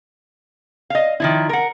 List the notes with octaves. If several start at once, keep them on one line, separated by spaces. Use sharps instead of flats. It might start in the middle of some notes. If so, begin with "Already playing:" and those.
D#5 F5
D#3 F3 E4
A#4 F#5